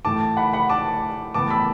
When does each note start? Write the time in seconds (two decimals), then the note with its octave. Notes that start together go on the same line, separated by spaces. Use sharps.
0.05 A2 E3 A3 A5 D6
0.37 F#5 B5
0.53 F#5 B5
0.69 A5 D6
1.34 A2 E3 B3 A5 D6
1.50 B5 E6